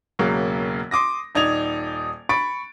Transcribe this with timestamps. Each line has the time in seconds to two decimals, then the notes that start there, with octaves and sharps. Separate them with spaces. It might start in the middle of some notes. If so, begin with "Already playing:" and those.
0.19 E1 C#3 F#3 A#3
0.91 C6 D6 D#6 A#6
1.35 D#1 D#4 D5 G#6 F7
2.29 B5 C#6 A6 D7